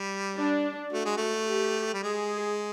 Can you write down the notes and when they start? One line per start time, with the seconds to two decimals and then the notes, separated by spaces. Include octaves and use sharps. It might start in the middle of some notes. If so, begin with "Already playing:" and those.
Already playing: G3
0.36 D4
0.92 A3 F#4
1.05 G#3
1.17 A3
1.47 G4
1.93 G3
2.03 G#3 G#4